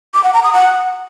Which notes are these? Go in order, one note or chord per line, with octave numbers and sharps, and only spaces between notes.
D6
F#5
A#5
D#6
F#5